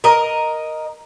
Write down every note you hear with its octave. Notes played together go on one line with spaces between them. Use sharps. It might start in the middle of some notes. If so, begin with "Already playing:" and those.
A#4 D#5